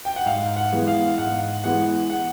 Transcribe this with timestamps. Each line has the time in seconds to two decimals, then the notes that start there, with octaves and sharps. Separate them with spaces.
0.05 G5
0.16 F#5
0.26 G#2 F5
0.56 F#5
0.72 E3 G#3 B3
0.87 F5
1.18 G#2 F#5
1.64 E3 G#3 B3 F#5
2.10 F#5